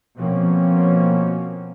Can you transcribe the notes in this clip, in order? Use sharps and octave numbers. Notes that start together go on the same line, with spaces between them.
B2 F3 A#3 C4 C#4